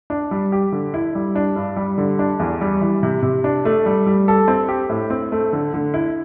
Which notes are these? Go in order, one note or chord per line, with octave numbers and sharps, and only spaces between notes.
D4
G3
G4
D3
E4
G3
D4
G2
G3
D3
D4
E2
G3
E3
C3
C3
D4
A3
G3
G3
A4
C4
G4
A2
C4
A3
D3
D3
E4